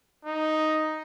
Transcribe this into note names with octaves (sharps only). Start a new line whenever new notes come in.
D#4